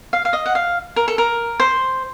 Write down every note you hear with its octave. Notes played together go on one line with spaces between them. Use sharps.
F5
F5
D#5
F#5
F5
A#4
A4
A#4
C5